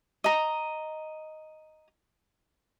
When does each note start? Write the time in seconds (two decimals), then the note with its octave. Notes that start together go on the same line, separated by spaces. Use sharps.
0.24 D#5 A#5